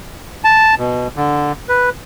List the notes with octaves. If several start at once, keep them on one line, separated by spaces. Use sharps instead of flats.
A5
B2
D3
B4